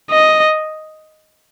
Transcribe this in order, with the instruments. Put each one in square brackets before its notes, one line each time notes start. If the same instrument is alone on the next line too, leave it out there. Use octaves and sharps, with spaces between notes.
[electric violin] D#5